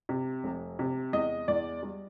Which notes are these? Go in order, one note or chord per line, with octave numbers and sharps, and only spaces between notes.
C3
F1
C3
E2 D#5
E2 D5
G3